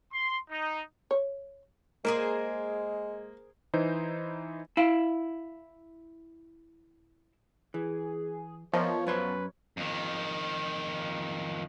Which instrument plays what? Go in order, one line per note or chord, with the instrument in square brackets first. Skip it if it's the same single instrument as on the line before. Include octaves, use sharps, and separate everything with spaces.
[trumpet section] C6
D#4
[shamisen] C#5
[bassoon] G#3 [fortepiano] A#3 [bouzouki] G#4 A#4 C5
[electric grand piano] E3 D#4 E4 C5
[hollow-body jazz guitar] E4 F5
[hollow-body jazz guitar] E3 [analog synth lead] G#4
[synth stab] F3 [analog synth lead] B3 [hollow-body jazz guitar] A#4 D#5 E5 [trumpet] C#5
[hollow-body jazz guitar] F#2 C#5 C6 [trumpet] B4
[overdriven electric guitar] F2 D#3